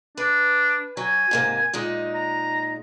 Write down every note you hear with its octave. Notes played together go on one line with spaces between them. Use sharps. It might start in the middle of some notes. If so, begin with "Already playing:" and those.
D4 B4
F#3 G#5
G#2 C3 A#3
A#2 G#3 D#4
A#5